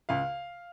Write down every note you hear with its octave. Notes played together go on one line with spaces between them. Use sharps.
C#2 F5